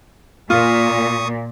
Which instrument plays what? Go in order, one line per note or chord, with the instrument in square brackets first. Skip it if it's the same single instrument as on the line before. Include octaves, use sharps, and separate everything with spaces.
[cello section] A#2 [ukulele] F4 [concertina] C#6 D#6